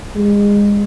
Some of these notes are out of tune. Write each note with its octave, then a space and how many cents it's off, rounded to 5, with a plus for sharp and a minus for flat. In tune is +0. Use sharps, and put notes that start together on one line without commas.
G#3 -25